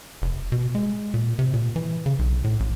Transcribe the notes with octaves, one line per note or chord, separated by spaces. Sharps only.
F1
B2
G#3
A#2
C3
A#2
E3
C#3
B1
A2
A1